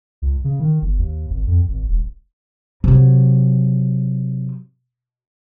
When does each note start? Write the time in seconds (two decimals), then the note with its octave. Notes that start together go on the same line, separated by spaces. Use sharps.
0.22 C#2
0.44 C#3
0.60 D#3
0.82 G1
0.99 D#2
1.30 G#1
1.47 F2
1.68 G#1
1.88 D#1
2.84 C3 F#3